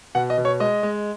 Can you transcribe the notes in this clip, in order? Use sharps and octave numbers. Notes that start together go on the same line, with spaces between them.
B2 F#5
D#5
B2
C#5
G#3 D#5
G#3